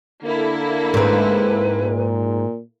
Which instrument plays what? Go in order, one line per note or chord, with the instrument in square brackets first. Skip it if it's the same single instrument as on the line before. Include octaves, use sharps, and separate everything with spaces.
[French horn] D3 [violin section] A#3 E4 A4
[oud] G#2 C4 [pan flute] B4
[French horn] A#2